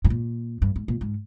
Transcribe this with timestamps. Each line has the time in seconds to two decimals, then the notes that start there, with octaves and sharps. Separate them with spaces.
0.05 G#2
0.10 A#2
0.62 G2
0.76 G#2
0.88 A#2
1.01 G#2